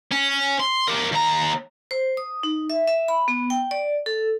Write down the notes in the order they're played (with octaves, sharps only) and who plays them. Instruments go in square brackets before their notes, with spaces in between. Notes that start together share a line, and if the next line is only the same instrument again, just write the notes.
[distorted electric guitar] C#4
C6
G4 A#4
D#2 A#5
[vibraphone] C5
D#6
D#4
E5
E5
B5
B3
G5
D5
A4